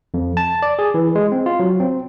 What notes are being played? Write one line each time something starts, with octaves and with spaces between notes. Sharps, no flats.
F2
A5
D5
G#4
E3
G#3
C4
F4
F#3
C4